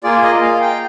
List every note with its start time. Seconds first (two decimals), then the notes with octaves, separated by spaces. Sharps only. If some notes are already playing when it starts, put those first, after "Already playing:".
0.03 A#3 F4 G#4 D5
0.23 D#5
0.42 F5
0.61 G5